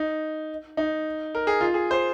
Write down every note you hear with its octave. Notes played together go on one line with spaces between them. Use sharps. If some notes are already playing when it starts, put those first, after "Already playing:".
Already playing: D#4
D#4
A#4
G#4
F4
G#4
C5